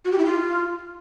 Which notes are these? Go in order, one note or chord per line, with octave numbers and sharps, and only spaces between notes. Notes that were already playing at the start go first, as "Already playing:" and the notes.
F#4
G4
E4
F4